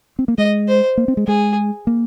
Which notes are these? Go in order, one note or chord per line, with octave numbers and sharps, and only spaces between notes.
C4
A#3
G#3 D#5
C5
A#3
C4
G#3
G#3 G#4
A#3